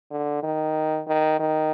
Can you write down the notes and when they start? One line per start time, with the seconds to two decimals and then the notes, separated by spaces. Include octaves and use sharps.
0.11 D3
0.43 D#3
1.08 D#3
1.40 D#3